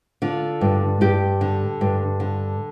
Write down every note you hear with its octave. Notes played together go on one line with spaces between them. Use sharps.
D3 F4
G2
G2 G4
D3
G2
D3